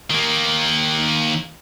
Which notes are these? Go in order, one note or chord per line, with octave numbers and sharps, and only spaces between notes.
D#3 A#3